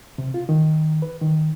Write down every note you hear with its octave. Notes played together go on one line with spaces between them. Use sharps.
C3
F4
D#3
B4
D#3